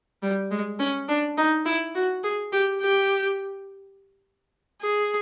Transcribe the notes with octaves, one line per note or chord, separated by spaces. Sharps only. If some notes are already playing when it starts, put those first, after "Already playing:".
G3
G#3
C#4
D4
D#4
E4
F#4
G#4
G4
G4
G#4